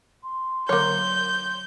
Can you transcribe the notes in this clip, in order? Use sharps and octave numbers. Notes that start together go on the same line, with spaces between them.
C6
D3 F#3 A#3 C#5 G6